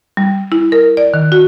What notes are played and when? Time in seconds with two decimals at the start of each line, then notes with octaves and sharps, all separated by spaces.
0.17 G3
0.52 E4
0.72 A#4
0.97 D5
1.14 D#3
1.32 F#4